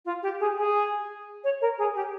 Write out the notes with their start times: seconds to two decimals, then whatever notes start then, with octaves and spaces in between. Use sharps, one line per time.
0.05 F4
0.22 G4
0.40 G#4
0.57 G#4
1.43 C#5
1.61 A#4
1.78 G#4
1.95 G4